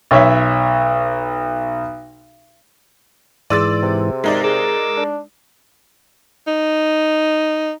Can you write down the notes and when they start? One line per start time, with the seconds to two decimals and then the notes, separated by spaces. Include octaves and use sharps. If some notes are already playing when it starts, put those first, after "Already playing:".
0.11 B1 C#5 E5
3.50 G#2 E3 G#4 D5 C6 E6 A6 D#7
3.83 C3
4.24 G#3 D#4 A#4 D5 E5
4.44 G#4 A#4 D6 E6
4.97 D4
6.47 D#4